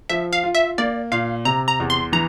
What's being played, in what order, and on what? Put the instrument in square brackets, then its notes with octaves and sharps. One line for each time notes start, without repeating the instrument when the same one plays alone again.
[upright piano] F3 [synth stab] E5
[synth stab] F5
[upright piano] F4
[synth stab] E5
[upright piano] A#3 [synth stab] D5
[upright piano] A#2 [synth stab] F5
[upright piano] C3 [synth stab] A#5
[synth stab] A#5
[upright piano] E2
[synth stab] C6
[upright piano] E3 [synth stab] A#5